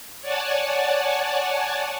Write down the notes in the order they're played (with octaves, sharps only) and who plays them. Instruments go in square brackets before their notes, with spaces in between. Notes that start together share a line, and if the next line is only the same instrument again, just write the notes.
[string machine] C#5 D5 F#5 G#5 A5